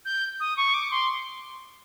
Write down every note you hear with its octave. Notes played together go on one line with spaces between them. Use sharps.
G6
D#6
C#6
D6
C6